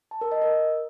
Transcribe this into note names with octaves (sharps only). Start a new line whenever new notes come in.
A5
A#4
D#5
A#4